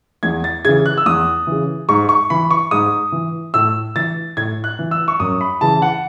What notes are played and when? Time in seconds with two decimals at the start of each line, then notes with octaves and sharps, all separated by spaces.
0.23 E2 G#6
0.44 A6
0.65 C#3 E3 G#6
0.86 F#6
0.98 E6
1.06 E2 D#6
1.47 C#3 E3
1.89 G#2 C#6
2.09 C#6
2.30 E3 B5
2.51 C#6
2.71 G#2 D#6
3.12 E3
3.54 A2 E6
3.96 E3 A6
4.37 A2 G#6
4.64 F#6
4.79 E3
4.91 E6
5.08 C#6
5.20 F#2 D#6
5.41 B5
5.61 C#3 E3 A5
5.82 F#5